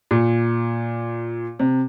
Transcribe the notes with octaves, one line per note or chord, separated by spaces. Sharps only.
A#2
C3